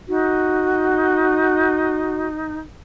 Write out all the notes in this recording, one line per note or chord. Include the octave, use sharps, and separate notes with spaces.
D#4 F#4